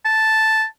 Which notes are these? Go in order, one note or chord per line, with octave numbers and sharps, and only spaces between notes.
A5